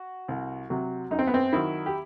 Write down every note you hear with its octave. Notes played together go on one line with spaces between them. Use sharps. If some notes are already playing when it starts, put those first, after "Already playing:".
Already playing: F#4
C2
C3 F#3
F#2 D#4
C4
B3
C4
D#3 F#3 E4
G4